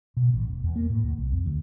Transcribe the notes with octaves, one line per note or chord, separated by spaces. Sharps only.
B2
A1
E1
E2
A#3
A2
D2
C2
F2
D2